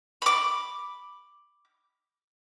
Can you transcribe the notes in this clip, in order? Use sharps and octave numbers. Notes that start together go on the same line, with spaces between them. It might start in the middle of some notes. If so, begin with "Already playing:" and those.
B5 D6